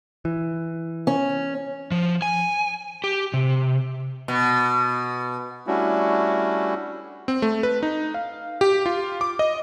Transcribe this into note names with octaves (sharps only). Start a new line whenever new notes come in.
E3
C#4
F3
G#5
G4
C3
B2
G3 A3 C#4 D4 E4 F#4
C4
A3
B4
D#4
F5
G4
F4
D6
D#5